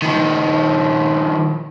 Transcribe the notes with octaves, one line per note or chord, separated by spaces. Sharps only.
D#3 F3